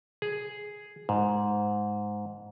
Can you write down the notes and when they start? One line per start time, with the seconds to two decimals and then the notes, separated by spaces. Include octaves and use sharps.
0.22 G#4
1.09 G#2